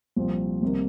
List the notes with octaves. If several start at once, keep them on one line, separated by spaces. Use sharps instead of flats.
C2 A#2 F3 C4
C2 C3 D#3 A#3